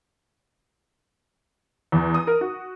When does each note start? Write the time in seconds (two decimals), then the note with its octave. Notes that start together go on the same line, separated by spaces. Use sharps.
1.92 E2
2.14 D#6
2.27 A#4
2.41 F#4